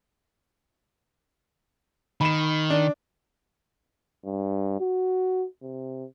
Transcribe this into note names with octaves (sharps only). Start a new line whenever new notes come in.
D#3 B5 E7
D4
G2
F#4
C3